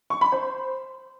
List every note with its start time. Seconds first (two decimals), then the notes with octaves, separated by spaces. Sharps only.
0.10 C#6
0.21 B5
0.32 C5